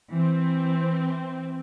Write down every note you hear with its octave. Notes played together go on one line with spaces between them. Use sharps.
E3 C4